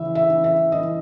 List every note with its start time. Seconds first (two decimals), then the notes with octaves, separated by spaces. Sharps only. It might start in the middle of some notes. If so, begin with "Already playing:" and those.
Already playing: C#3 E3 E5
0.15 E5
0.30 E3
0.44 E5
0.72 E3 D#5